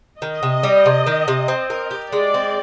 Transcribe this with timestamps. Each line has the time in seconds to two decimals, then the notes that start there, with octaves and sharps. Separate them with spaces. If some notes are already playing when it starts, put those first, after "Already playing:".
0.22 D#3 D#5
0.43 C3
0.63 G3
0.86 C3
1.07 D#3
1.28 C3
1.48 C4
1.70 A#4
1.91 G4
2.12 G#3 D5
2.34 C4